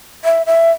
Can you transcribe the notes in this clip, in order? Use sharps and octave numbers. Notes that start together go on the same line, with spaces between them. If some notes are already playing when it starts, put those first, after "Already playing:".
E5
E5